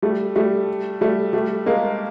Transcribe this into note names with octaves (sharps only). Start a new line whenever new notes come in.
G3 A3
G3 A3
G3 A3
G3 A3
G#3 A#3